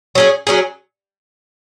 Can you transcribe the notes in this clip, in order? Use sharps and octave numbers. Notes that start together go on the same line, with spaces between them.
F#3 C#4 G#4
F#3 C#4 G#4